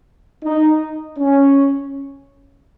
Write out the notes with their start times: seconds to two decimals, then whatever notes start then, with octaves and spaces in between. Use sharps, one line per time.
0.44 D#4
1.18 C#4